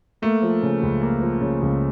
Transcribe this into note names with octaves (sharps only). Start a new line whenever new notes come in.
A3 A#3
F3
C#3
C#2
A#3
F3
C#3
C#2